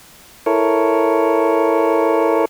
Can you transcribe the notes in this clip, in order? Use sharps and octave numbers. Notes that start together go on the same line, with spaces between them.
E4 A4 A#4 C#5